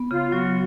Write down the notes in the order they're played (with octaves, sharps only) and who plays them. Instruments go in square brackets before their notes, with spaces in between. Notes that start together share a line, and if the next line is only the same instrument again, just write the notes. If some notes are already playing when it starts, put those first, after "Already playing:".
Already playing: [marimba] B3
[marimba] C#3 [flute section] F4
[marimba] F#3 [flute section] F#4